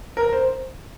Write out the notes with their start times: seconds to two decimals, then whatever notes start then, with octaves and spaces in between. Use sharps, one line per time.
0.17 A#4
0.33 C5